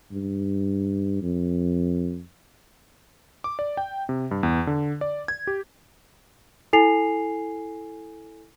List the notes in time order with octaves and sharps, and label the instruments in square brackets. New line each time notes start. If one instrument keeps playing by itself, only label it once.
[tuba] G2
F2
[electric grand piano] D6
D5
G5
C3
G2
E2
D3
D5
G#6
G4
[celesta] E4 A4 G#5 C7 F7